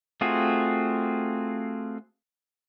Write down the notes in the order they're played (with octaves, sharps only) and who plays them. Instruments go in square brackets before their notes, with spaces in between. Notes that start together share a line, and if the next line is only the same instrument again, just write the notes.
[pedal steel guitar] A3 C4 F4 F#4 G#4